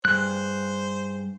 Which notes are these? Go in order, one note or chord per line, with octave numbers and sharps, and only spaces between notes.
G2 G#4 C5 F#6